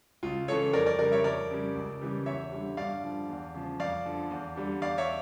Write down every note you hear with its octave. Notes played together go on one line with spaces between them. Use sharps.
C#2 F4
C#3 E3 A4 C#5
F2 A#4 D5
A#4 D5
C#3 G3 A#4 D5
C#5 E5
F2 A#4 D5
C#3 G3
C#2
C#3 E3 G3
E2 C#5 E5
D3 G3
G2 D5 F5
D3 F3
E2
C#3 F3
F2 D5 F5
D3 F3
E2
D3 G3
E2 D5 F5
C#5 E5